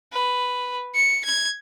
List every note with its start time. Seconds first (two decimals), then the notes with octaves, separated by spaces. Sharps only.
0.12 B4
0.95 C#7
1.25 G#6